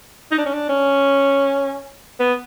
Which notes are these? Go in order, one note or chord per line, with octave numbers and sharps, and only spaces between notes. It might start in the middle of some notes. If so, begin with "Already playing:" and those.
D#4
D4
C#4
D4
C#4
B3